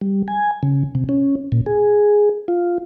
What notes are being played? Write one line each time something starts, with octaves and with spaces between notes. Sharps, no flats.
G3
G#5
C#3
C3
C#4
A#2
G#4
F4